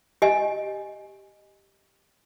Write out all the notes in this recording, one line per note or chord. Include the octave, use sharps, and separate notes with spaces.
G4 D#5 G#5